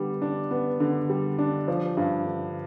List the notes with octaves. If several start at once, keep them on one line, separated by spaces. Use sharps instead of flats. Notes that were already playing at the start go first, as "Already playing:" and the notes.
Already playing: D3 G3 B3
D4
B3
D3
G3
D4
F3
G2
D3